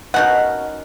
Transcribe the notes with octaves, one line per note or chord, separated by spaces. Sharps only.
B2 C#4 D#4 A#4 F#5